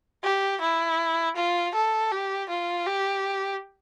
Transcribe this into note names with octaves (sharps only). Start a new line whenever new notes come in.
G4
E4
F4
A4
G4
F4
G4